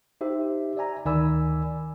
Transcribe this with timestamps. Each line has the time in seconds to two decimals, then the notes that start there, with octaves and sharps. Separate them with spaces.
0.21 D#4 G4 C5 E5
0.77 D5 E5 G#5 A#5
1.05 D2 D#3 D5 G#5 B5 E6